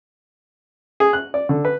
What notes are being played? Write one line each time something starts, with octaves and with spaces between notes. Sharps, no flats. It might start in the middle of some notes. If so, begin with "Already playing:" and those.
G#4
F#6
D5
D3
B4